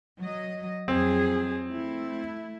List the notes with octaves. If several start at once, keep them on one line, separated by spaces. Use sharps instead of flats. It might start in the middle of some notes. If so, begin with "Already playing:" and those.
F#3 D#5
F2 F#3 C4 G#4
A3 E4